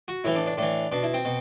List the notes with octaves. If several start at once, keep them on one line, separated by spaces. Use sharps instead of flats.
F#4
A2 E3 E4
D4
D4
A2 E3 D4
B2 D4
E4
C4
B2